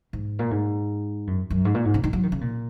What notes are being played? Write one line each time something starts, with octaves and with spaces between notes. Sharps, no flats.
G#2
A#2
G#2
F#2
F#2
G#2
A#2
G#2
C#3
D#3
F#3
D#3
C#3
A#2